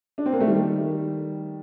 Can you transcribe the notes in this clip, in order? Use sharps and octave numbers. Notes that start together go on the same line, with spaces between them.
D4
C4
A#3
A3
D#3 G3